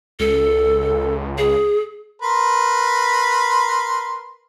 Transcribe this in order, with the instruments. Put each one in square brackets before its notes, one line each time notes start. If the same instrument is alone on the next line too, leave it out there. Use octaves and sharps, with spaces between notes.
[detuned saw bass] C#2 [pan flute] A4
[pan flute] G#4
[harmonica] A#4 B4 C6